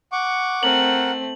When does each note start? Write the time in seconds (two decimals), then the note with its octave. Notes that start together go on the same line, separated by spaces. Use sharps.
0.12 F#5 C#6 D6
0.63 A3 C4 A#4 F#5 F#7